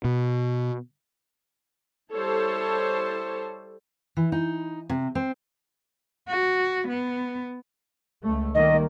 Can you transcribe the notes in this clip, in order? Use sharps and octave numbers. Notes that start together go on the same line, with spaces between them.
B2
G3 E4 A4 C5 C#5 A5
E3
D#4
C3
C4
F#4
B3
C#2 A3
D#3 G3 A#3 D#5